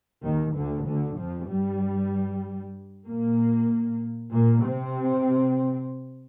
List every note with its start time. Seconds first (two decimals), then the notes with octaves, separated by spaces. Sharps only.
0.23 D#2 D#3
0.55 D2 D3
0.86 D2 D3
1.17 F2 F3
1.49 G2 G3
3.07 A#2 A#3
4.33 A#2 A#3
4.64 C3 C4